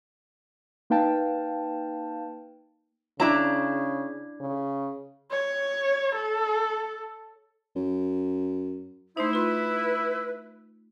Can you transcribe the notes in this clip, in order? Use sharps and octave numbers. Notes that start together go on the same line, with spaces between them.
A#3 D#4 B4 F5 G5 A5
C#3 D4 E4 A#5
C#3
C#5
A4
F#2
A3 D#4 E4 C5
F4 B4 C6